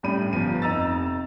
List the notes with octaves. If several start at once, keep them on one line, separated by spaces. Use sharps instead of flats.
F#2 A2 G3 D4 B5 D#7
G1 F3 D#7
F1 D#4 A#5 E6 A6